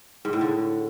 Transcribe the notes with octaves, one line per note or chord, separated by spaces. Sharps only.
G#2
A2
D3